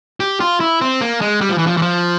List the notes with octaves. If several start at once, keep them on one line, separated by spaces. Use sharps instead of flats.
G4
F4
E4
C4
A#3
G#3
G3
F3
E3
F3
E3
F3